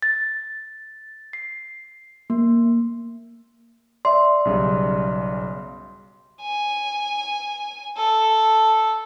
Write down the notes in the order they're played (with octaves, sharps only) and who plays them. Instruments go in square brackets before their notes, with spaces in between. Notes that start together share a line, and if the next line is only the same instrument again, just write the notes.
[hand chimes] A6
C7
A#3
[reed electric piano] D5 E5 [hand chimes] C6
[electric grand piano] B1 C#3 G3
[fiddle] G#5
A4